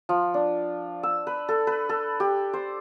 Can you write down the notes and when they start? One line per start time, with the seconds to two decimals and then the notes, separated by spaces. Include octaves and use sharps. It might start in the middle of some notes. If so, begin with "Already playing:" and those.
0.09 F3
0.34 D4
1.03 E6
1.27 B4
1.49 A4
1.67 B4
1.89 A4
2.20 G4
2.53 C5